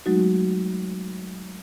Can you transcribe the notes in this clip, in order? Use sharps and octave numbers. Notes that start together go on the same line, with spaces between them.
F#3 G#3 A3 D#4 F#4